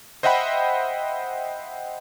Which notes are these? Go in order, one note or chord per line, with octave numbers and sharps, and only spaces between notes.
C5 D#5 E5 F#5 G5 B5